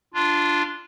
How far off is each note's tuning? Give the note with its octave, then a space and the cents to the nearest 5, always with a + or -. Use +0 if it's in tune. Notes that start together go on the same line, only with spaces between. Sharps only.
D4 +0 F4 -10